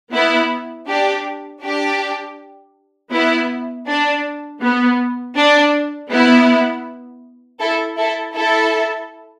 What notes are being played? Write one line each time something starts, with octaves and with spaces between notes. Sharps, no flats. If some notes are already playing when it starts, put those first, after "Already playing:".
B3 E4
D4 G4
D4 G4
B3 E4
D4
B3
D4
B3 E4
E4 A4
E4 A4
E4 A4